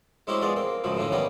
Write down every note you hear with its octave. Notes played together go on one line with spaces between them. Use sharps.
G#3 C#4 E4 F#4 G4 C5
G#3 B3 F4 D5
A#3 C4
C#2 F#2 C#3 F3
A2 D3 F3 C#4
D#3 G3 A#3 B3 C#4